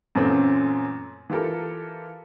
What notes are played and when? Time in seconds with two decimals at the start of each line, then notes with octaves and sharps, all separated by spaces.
0.15 F#2 A#2 E3 A3 C4 C#4
1.30 E3 F4 G4 A4 A#4